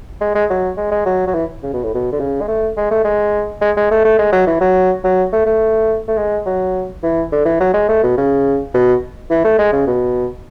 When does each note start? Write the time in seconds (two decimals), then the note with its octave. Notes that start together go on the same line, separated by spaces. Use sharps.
0.21 G#3
0.35 G#3
0.50 F#3
0.78 G#3
0.91 G#3
1.06 F#3
1.27 F#3
1.35 E3
1.63 C#3
1.73 B2
1.84 A2
1.94 B2
2.12 D3
2.20 C#3
2.41 G#3
2.48 A3
2.77 G#3
2.91 A3
3.04 G#3
3.61 G#3
3.77 G#3
3.91 A3
4.05 A3
4.18 G#3
4.32 F#3
4.47 E3
4.61 F#3
5.04 F#3
5.33 A3
5.46 A3
6.08 A3
6.18 G#3
6.46 F#3
7.03 E3
7.32 D3
7.45 E3
7.60 F#3
7.74 G#3
7.89 A3
8.03 B2
8.17 C#3
8.74 B2
9.30 E3
9.44 A3
9.59 G#3
9.73 C#3
9.87 B2